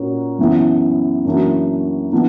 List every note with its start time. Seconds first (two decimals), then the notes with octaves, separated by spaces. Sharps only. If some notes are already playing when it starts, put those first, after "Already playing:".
Already playing: A#2 A#3 C#4 F#4
0.39 F#2 E3 B3 E4
1.25 F#2 E3 A#3 D4 F#4
2.12 E3 B3 D4